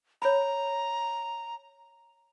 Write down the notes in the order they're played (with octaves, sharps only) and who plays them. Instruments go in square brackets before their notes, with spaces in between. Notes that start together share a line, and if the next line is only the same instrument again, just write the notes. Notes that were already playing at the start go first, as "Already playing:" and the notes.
[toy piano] C#5 B5 [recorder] A#5